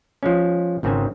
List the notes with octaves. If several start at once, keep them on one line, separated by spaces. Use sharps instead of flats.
F3 G#3 C#4
G#1 G#2 C#3 C4 A4 G#5